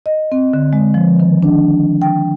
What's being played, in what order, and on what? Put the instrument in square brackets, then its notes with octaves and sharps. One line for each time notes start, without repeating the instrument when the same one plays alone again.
[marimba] D#5
C4
D3
G#3
F3
D#3
D4
G5